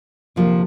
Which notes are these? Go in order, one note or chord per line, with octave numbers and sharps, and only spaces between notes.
D2 C3 F3 A#3 F4